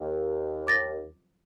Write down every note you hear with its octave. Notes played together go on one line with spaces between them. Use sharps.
D#2
D6 A6 A#6